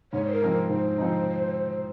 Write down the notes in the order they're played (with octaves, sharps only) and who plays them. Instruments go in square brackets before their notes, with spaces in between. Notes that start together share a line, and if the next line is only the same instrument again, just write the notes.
[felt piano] G#2 [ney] C#5
[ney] C5
A#4
[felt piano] F3 C4 D#4
[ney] A#4
[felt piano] G#2 [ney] C5
[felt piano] F3 C4 D#4